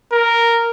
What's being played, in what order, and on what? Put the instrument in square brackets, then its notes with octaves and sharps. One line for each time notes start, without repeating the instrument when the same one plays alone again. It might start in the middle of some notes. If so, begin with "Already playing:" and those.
[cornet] A#4